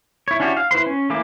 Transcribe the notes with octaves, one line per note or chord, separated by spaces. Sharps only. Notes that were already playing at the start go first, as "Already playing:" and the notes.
E4 C#5
C#4 D4 E4 F#4 G4
F5
E4 B4 C5 C6
C#4
E3 A3 A#3 E4 D6